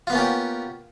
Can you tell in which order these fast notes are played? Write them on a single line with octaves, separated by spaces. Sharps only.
F4 B3 A#3 C#4 G4